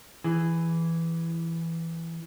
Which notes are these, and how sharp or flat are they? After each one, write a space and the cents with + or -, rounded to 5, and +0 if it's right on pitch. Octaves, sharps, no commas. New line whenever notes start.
E3 +5 G#4 +0